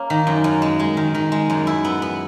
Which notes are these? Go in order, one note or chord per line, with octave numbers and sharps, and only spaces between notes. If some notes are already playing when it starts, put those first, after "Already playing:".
Already playing: A#3 C#4
D#3
F#2
F#2
G#3
G#3
D#3
D#3
G#3
F#2
E4
B3
B3